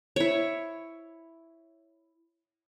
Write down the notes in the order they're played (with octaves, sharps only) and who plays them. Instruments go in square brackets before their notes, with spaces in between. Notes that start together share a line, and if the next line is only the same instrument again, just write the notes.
[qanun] E4 C#5